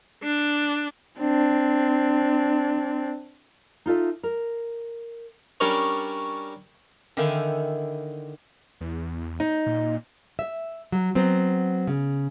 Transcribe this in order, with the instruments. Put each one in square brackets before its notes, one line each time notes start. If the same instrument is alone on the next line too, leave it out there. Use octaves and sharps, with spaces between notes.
[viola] D4
[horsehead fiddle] C4 D4
[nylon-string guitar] D#4 F4 A4 E5
A#4
[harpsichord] G3 C#4 D4 A#4 C#5
[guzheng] D3 D#3 E4 F5 G5 G#5
[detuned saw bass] E2
[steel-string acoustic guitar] D#4
[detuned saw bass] A#2
[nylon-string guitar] E5
F#3
F#3 B3 C4
C#3